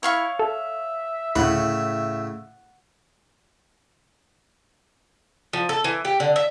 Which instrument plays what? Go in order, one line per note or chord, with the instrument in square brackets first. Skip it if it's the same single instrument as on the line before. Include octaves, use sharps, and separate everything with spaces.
[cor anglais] E4 [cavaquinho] C#5 F5 C#6
[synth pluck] A4 [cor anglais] E5
[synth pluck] D2 E4 [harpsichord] A2 C#3 [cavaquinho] F#5
[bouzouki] F3
A4
E3
G4
D3
E5